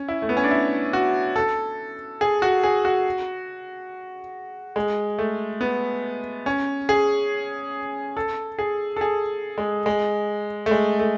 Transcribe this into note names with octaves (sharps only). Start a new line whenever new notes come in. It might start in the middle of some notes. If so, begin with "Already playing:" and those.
Already playing: C#4
E4
A3
B3
C#4
D4
E4
F#4
A4
G#4
F#4
G#4
F#4
G#3
A3
B3
C#4
G#4
A4
G#4
A4
G#4
G#3
G#3
A3
G#3
A3